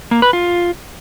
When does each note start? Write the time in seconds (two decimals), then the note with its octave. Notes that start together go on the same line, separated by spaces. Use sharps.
0.11 A#3
0.22 B4
0.33 F4